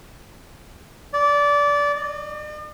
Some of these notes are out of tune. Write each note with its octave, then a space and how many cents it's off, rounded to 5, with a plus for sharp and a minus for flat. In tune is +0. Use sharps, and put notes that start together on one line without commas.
D5 -20
D5 +45